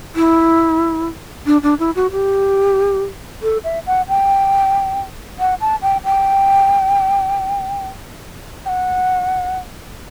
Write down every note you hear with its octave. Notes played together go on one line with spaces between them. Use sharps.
E4
D4
D4
E4
F#4
G4
A4
E5
F#5
G5
F#5
A5
G5
G5
G5
F#5